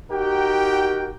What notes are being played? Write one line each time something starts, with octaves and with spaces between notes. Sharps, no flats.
D#4 F#4 G4 A#4 F#5 G5